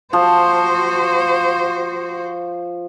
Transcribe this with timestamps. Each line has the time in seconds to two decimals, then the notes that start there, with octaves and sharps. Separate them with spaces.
0.13 F3 F#4 C5